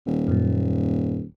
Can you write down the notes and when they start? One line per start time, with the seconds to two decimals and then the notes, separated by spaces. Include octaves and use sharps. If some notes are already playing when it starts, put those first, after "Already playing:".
0.06 D#1
0.28 F#2 A#2